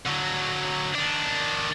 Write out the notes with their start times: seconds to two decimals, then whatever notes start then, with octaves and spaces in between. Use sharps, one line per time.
0.06 D3 F#3
0.95 D#3 D4